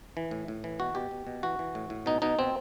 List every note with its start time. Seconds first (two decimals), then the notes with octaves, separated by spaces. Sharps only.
0.17 E3
0.31 A2
0.48 A2
0.64 E3
0.79 B2 F#4
0.95 B2 G4
1.11 B2
1.27 B2
1.43 E3 F#4
1.59 E3
1.75 A2
1.90 A2
2.06 B2 D#4
2.22 B2 D#4
2.39 B2 C4